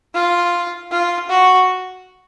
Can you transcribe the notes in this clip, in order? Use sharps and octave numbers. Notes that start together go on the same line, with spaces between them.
F4
F4
F#4